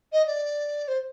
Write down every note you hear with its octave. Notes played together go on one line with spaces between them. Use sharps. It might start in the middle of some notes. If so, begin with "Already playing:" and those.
D#5
D5
C5